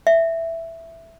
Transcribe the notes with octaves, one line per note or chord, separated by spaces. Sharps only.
E5